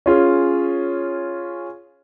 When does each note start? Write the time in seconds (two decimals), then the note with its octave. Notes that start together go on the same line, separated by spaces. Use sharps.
0.06 C#4 F4 G#4